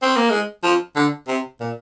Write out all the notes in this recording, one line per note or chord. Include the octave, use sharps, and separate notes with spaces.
C4
A#3
G#3
F3
D3
C3
A#2